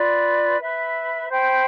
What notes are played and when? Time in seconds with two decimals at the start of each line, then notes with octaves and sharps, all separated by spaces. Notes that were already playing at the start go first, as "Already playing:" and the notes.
Already playing: F4 B4 D5
0.59 B4 E5 B5
1.29 C5 G5 B5